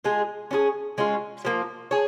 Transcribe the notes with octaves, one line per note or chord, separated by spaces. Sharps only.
G#3 F4 G#4
C#4 F4 G#4
G#3 C#4 F4
F3 A#3 F4
G#4 C#5